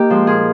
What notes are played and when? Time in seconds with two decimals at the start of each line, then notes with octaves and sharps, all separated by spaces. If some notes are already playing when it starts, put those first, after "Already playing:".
Already playing: A#3 D#4 G4
0.10 F3 G#3
0.27 A#2 G#4